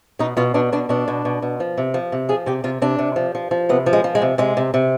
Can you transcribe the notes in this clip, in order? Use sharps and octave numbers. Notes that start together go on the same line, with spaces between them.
B2 D#4
B2 F4
B2 D4
B2 D4
B2 D4
B2
B2
B2
F3
C3
F3
C3
F3 G#4
C3 G4
C3 F4
C3 D4
C3
F3
F3
F3
C3 B3
F3
G#3
F3
G#3
C3
C3 G#3
C3
C3